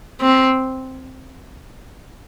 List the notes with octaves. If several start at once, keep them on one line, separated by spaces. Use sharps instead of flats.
C4